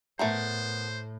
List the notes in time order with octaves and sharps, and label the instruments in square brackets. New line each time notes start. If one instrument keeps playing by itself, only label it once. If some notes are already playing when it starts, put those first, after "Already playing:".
[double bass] A2 [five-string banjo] A3 B3 A#4 [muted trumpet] C5